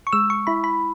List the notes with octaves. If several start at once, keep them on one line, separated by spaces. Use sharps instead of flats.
C#6
G#3 E6
C#6
E4 B5
B5